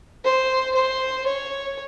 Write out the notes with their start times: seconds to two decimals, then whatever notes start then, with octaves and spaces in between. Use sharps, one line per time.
0.24 C5
0.74 C5
1.26 C#5